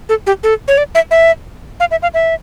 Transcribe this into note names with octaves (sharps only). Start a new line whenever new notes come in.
A4
G4
A4
C#5
D5
E5
E5
F5
E5
F5
E5